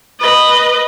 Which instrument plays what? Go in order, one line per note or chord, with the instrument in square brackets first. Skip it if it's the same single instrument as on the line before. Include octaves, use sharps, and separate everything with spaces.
[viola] B4 D#5